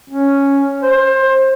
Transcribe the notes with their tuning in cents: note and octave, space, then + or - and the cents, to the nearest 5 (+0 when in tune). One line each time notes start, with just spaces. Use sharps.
C#4 +0
C5 +20